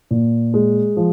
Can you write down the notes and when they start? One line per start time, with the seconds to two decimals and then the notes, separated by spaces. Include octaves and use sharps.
0.11 A#2
0.54 G#3
0.97 F3